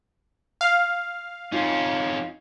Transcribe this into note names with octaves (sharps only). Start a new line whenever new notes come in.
F5
F2 C#4 D#4 F4